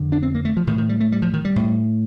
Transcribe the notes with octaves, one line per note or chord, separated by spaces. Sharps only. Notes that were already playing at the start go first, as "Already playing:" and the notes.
Already playing: F2 D3
D4
C4
A#3
A3
F3
A2 D#3
D#3
G3
A3
G3
F3
D#3
G3
A2